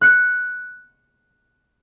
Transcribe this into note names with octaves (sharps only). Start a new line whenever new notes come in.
F#6 C#7